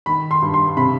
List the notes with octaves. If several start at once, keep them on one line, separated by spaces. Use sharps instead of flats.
D#3 B5
C6
G2
C6
C3 B5